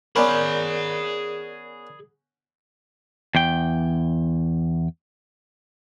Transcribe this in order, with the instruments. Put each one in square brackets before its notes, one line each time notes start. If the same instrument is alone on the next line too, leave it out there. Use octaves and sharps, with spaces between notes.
[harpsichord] B3 C#4 C5 [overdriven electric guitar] G#4 B5 [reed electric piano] A#4 D5
[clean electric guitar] E2 G5